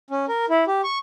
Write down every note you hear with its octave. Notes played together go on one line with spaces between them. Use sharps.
C#4
A#4
E4
G4
C#6